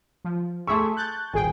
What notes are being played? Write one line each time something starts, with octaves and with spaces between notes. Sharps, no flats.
F3
A3 G#4 E5 A5 C6 C#6
F#6 G6 A6
D#1 G#1 G#4 G5 G#5